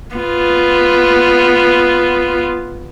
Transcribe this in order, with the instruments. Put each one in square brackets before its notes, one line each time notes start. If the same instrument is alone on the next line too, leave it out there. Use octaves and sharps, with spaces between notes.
[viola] B3 F4